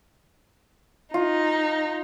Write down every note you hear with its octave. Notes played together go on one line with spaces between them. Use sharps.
D#4 F4